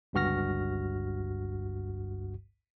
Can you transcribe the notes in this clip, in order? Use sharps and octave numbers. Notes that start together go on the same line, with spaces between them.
G1 C#2 G2 F#4 F6 A#6